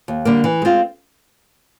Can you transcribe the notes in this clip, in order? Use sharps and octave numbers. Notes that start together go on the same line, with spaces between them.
D#2
D3 G3 A#3
E3
G#3 C4 F4